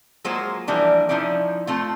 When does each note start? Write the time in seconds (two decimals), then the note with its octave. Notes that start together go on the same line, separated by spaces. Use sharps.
0.24 F#3 G#3 A#3 F4 G#4 C5
0.68 E3 F3 G3 A#3 D4 A#4
1.09 F3 C#4 D#4 E4 D5
1.67 A3 C4 F4